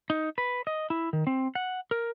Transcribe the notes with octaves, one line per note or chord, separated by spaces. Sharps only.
D#4
B4
D#5
E4
D#3
C4
F#5
A#4